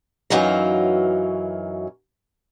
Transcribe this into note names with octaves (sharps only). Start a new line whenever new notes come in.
F#2 E3 F#3 D#4 F5 A#5